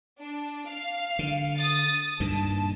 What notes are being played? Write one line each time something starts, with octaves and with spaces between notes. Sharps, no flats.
D4
F5
D3
D#6 A6
G2 A#2 D#3 A5